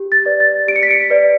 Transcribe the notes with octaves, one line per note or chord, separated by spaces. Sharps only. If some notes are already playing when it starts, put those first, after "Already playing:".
Already playing: G4
A6
B4 D5
A6
G4 D7
C#7
B6
C#7
B4 D5